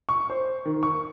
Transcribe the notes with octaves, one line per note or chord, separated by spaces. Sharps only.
C#6
C5
D#3
C#6